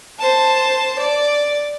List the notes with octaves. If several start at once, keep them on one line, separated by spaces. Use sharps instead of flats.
C5 A5
D5